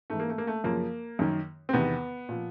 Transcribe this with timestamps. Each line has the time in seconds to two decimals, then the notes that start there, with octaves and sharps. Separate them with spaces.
0.10 G#2 E3 A3
0.20 A#3
0.29 A3
0.38 A#3
0.47 A3
0.64 F#2 C#3 F3 A#3
1.19 F#2 D#3
1.69 C4
1.73 E2 C3 D#3 B3
2.29 A#2 F3